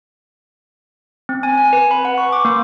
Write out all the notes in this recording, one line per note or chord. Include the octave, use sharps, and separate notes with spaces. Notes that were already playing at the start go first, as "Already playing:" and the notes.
C4
G#5
G#5
B4
B5
F#5
C#6
D6
A#3